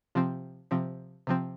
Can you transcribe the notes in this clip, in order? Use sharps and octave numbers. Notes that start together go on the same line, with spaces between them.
C3 F3 C4
C3 F3 C4
C3 F3 C4